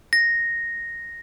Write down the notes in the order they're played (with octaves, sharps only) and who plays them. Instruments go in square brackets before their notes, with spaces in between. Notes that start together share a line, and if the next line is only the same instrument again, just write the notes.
[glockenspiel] A#6